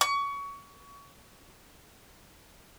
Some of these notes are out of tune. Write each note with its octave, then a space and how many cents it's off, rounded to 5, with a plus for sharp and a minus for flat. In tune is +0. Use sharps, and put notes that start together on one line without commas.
C#6 +25